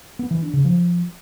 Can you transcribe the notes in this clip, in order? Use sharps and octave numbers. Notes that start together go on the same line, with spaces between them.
B3
E3
D4
C#3
F3